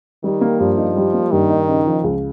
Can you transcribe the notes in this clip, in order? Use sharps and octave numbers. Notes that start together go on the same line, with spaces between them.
D#3 G3
A#3
G2 F3
D#4
G3
A#3
G2 D#3
D#4
C#3
F3
C#2